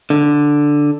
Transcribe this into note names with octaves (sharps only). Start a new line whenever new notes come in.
D3